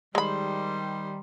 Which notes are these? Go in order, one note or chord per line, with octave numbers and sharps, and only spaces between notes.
D#3 G3 G#3 D#4 C5 B5